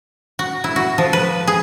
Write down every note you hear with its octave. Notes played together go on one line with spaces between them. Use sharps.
F#4
E4
F#4
F3
B4
G#4